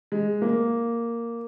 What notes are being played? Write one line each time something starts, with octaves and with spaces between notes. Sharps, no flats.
G#3
A#3